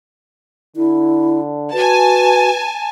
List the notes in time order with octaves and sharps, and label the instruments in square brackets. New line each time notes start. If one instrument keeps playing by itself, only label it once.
[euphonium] D3 [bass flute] E4
[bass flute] F#4 [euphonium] B4 [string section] G#5 A5